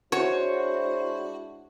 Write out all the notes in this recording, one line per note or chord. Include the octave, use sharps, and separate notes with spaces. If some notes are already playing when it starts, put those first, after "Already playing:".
G#3 D4 E4 F#4 C5 C#5